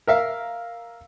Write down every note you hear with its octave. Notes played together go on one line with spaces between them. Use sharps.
A#4 E5 F5